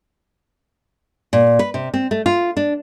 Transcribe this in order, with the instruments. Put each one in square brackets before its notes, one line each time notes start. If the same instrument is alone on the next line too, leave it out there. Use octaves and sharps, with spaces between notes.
[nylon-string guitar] A#2
B4
C3
C4
A3
F4
D4